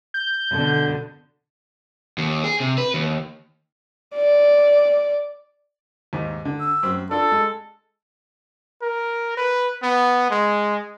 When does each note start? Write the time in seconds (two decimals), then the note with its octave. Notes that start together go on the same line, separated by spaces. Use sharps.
0.14 G6
0.53 B2 D3
2.18 D#2
2.44 G#4
2.60 C3
2.78 B4
2.94 D#2
4.15 D5
6.13 D#2 G#2
6.45 D3
6.61 E6
6.83 F#2 C4
7.11 D4 F4 A4
7.32 G#3
8.82 A#4
9.37 B4
9.83 B3
10.30 G#3